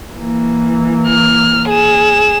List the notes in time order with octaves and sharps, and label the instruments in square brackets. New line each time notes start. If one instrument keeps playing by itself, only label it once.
[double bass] E3 A#3
[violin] F6
G#4 E7